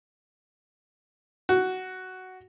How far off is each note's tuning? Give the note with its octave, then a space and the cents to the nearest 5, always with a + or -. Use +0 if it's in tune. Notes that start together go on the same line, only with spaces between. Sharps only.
F#4 +10